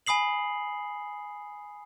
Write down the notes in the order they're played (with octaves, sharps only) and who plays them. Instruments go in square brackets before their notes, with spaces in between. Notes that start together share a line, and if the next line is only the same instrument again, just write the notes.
[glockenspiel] G#5 B5 D#6 C7 F#7